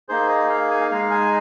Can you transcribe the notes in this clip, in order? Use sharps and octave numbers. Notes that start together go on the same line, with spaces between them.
A#3 D#4 G#4 C5
D#5
F5
G#5
F5
G#3 D#4 G#4 F5
G#5